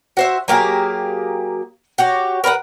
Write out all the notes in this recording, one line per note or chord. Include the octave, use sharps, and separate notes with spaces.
F#4 C5 E5
F#3 A#3 G4 G#4
F#4 G4 C#5
A#4 B4 F5 F#5